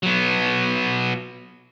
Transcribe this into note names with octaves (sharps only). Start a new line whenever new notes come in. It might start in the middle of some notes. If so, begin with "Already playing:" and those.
F#3 B3